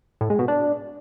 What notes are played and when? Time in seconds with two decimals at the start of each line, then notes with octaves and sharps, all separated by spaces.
0.21 A2
0.30 G#3
0.39 B2
0.48 D4